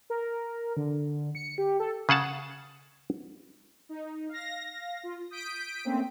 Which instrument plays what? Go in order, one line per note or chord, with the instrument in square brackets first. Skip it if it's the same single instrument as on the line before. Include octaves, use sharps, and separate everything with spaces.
[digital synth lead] A#4
D3
C#7
G4
A4
[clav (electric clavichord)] C#3 G#4 F#5 A5
[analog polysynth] D#4
F5 A#6
F4
D#6 G6 B6 D7
A3 A#3 C4 C#4